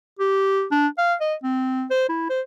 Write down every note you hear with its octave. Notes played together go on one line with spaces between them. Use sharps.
G4
D4
F5
D#5
C4
C5
E4
C5